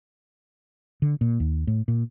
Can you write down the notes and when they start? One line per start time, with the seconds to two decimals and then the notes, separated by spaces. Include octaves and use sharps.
1.02 D3
1.21 A#2
1.40 D#2
1.67 A2
1.88 A#2